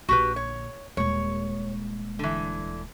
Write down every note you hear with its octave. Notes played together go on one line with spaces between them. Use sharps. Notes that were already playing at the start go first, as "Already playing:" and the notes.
A#1 D3 F#4 G4 B4
C#5
D#1 G#3 C#5
D3 E3